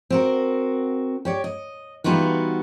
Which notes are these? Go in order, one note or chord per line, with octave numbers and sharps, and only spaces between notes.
C4 F#4 A#4
G4 C#5 D5
D#5
E3 G3 B3 D#4 F4 F#4